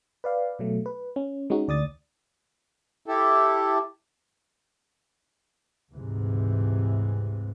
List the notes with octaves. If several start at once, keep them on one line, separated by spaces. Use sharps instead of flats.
B4 D5 F5
B2 F#3 A3
B4
C#4
G#3 C#4 D#4 F#4
D2 D5 D#6 A6
E4 G4 A4
D2 G#2 C3 E3 G#3